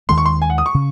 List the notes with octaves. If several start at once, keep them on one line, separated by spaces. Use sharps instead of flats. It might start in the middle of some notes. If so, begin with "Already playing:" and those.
D#2 D#3 G#3 C6
C#6
C6
G#5
F#5
D#6
C#6
C#3